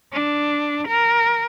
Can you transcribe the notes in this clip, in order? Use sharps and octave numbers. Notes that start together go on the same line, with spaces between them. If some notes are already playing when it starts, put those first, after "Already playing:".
D4
A#4